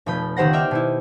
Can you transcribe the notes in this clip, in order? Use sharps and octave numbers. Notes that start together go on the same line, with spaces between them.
F1 B2 F3 B5 G6
C#2 D#3 G4 C5 F#5 A#6
D5 E5 G5 F6
B2 D#4 E4